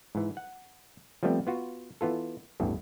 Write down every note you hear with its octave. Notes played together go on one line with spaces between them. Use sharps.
G#2 E3
F#5
F3 G3 A3 B3 C4
B3 F4 F#4
E3 B3 F4 A4
A1 E2 G2